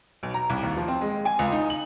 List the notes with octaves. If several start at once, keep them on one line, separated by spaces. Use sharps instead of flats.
B1
A#5
C2
D#2
F3
C4
G#3
G#5
C#2
D#4
F#7